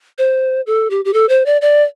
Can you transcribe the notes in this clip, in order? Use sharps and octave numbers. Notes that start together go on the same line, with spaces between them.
C5
A4
G4
G4
A4
C5
D5
D5